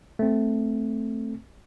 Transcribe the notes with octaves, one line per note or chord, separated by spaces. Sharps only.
A3 C4